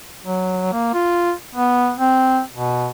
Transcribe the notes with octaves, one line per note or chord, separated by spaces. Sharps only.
F#3
A#3
F4
B3
C4
B2